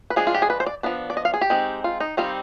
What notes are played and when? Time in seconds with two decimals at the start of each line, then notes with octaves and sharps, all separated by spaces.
0.10 B4
0.16 F3 G#3 D4 G#4
0.27 F4
0.34 G4
0.42 G#4
0.50 B4
0.60 C5
0.66 D5
0.83 F3 B3 D4
1.10 D5
1.17 D#5
1.25 F5
1.34 G#4
1.41 G4
1.50 G#3 C4 D#4
1.84 F4
2.00 D#4
2.17 D#3 G3 C4 D#4 F4